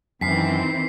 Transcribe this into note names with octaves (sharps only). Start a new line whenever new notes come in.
F#2 D#3 E3 C4 B6 C7